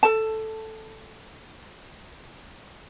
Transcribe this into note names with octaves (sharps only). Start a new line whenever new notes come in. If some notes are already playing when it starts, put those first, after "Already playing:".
A4 A5